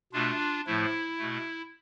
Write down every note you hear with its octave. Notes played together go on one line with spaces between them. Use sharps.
B2 A3 D4 F4
A2 F3 A3 E4
B2 A3